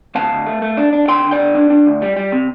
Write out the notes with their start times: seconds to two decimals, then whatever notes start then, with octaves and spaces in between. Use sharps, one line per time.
0.15 D2 F5 A5
0.32 D2
0.46 A3
0.62 A3
0.77 D4
0.93 D4
1.08 D3 G5 C6
1.24 D3
1.31 D5 G5
1.40 D3
1.55 D4
1.70 D4
1.86 D2
2.02 G3
2.17 G3
2.32 C3